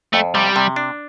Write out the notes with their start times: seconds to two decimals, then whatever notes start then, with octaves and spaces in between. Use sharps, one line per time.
0.13 F2 A3
0.35 C3 G3
0.56 C3
0.76 D4